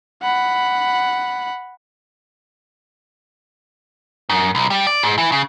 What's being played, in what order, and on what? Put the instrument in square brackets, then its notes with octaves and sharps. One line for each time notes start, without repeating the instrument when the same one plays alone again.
[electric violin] F#5 B5
[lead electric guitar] F#2
B1
G3
D5
G#2
E3
C#3